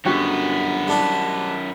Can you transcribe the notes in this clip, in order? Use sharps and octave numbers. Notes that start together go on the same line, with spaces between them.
G1 F#2 B3 F#4 G4
G3 D4 E4